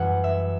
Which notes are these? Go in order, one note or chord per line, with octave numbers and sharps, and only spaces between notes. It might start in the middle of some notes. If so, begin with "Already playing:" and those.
Already playing: F#2 E3 G3 F#5
E5